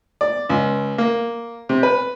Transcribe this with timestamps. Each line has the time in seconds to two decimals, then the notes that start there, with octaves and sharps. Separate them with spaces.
0.21 D5
0.50 C#2
0.98 A#3
1.69 C3
1.83 B4